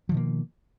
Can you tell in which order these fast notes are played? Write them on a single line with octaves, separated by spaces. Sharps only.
F3 D#3 B2 A#3